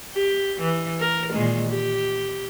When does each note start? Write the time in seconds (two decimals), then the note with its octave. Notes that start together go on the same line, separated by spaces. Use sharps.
0.14 G4
0.60 E3
1.00 A#4
1.33 A#2 D#3 G#3
1.69 G4